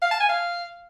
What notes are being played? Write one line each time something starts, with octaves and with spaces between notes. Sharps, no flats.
F5
A5
G#5
F5